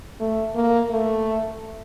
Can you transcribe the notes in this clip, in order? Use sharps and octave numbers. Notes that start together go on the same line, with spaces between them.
A3
A#3
A3